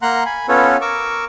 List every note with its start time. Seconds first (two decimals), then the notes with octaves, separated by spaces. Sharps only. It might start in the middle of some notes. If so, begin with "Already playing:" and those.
0.02 A#3 F#5 A#5 C6 F#6
0.26 G#5 B5
0.49 B3 C#4 F4 A4 B4 C#5
0.81 A#4 C#6 D6 E6